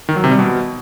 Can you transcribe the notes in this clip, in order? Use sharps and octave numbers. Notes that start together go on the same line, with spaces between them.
D#3
F#3
C3
G3
B2